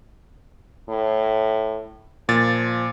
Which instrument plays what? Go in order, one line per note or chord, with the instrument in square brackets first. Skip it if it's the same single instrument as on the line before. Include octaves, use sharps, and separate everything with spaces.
[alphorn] A2
[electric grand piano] A#2 A6 [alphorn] F3